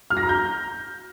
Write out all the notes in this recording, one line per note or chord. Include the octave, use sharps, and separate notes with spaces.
F6
A#6
A#5
G6